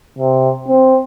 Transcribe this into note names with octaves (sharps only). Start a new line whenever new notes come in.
C3
C4